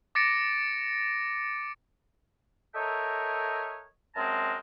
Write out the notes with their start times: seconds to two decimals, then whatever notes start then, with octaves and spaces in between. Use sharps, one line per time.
0.15 D6 A6 A#6 C#7 D7
2.75 A4 A#4 C#5 D#5 E5 G5
4.16 F#2 G#3 C4 F4 A5 A#5